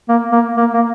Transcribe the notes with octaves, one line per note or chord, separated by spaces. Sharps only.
A#3
A#3
A#3
A#3